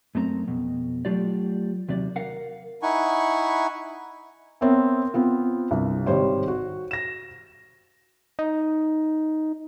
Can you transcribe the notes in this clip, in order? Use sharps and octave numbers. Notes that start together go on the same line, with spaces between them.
F#2 A3 C4 A#5
F2 B2
F#3 A3 F4 G4 D5
D#2 C3 F#3 D5
A#4 F5 F#5
D#4 E4 F#5 G#5 C#6
B3 C4 A#4 C#5 E5
B3 C4 F4
C2 G2
G#1 G3 C5 C#5
F#4
A#6 E7
D#4